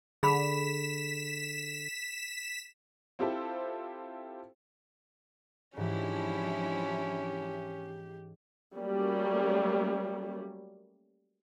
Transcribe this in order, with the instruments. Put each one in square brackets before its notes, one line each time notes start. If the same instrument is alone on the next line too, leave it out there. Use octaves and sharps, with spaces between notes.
[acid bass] D3 [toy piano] G#4 B5 [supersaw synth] B6 E7
[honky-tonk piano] C4 E4 F4 G4 A4 C5
[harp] G#2 E3 [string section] F3 D4 E4 [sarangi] C#4 [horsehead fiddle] G4
[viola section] F#3 G3 A3 A#3 C#4